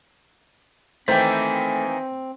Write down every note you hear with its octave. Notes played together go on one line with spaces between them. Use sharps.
D#3 E3 A3 A#3 C4 C5 G5